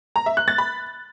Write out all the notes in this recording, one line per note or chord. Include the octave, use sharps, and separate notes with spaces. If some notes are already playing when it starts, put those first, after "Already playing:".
A#5
E5
F#6
A6
B5